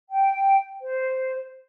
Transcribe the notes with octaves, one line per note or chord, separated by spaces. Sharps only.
G5
C5